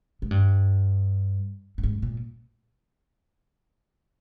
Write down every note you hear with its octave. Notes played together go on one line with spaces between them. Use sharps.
G#2
G2
G2
G#2
A#2